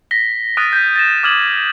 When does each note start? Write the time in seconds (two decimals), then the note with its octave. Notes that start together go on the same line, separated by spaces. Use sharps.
0.11 A#6 B6 G7
0.57 D#6 F6 F#6 A6 D7 D#7
0.73 G6 B6 D#7
0.96 A6 A#6 E7
1.23 D6 D#6 F6 G#6 E7 F#7